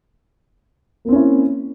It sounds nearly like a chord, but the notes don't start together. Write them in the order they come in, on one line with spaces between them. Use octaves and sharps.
A#3 C4 C#4 E4